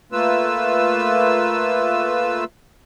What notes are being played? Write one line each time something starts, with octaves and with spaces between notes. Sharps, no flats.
A3 A#3 F4 B4 E6